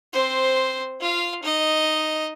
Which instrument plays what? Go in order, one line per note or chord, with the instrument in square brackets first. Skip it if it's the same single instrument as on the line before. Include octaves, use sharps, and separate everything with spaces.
[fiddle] C4 C5
F4 F5
D#4 D#5